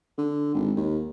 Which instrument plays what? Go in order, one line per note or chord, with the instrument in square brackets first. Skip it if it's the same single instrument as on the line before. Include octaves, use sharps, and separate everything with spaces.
[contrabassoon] D3
G#1
D#2